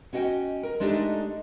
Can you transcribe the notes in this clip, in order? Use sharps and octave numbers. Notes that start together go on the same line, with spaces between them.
C#4 F#4 D#5 E5 G5
A#4
G#3 A3 D4 D#4 G4 A4